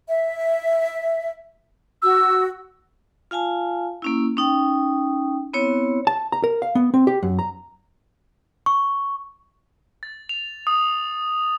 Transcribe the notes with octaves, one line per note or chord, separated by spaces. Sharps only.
E5
F#4 E6
F4 F5 G#5 A5
A#3 C#4 E4
C#4 D#4 G5
B3 C4 E4 C#5
A5
A#5
A#4
F5
B3
C4
G4
F#2
A#5
C#6
A6
F7
D#6